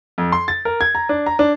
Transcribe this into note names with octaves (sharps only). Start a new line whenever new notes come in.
F2
C6
A6
A#4
G#6
A#5
D4
A#5
D4